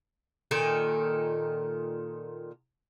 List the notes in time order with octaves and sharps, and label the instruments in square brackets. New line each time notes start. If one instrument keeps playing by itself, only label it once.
[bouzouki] A#2 D#3 A4